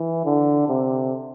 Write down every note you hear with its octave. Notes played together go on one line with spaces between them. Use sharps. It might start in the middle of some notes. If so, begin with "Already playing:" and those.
Already playing: E3
D3
C3